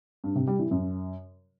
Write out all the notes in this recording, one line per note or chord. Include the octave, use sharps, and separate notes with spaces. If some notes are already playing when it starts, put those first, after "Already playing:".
G2
C3
G3
E3
F#2